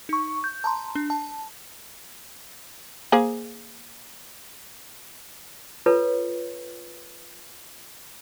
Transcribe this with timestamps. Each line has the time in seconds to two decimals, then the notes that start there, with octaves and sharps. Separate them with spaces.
0.09 D#4 C#6
0.44 G6
0.64 A5 A#5 C6
0.95 D4
1.10 A5
3.12 A#3 G#4 C5
5.86 F4 A4 B4 C#5